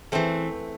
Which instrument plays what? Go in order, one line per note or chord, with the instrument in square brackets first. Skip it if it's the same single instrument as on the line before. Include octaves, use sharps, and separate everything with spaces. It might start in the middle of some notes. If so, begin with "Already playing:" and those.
[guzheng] E3 A3 C4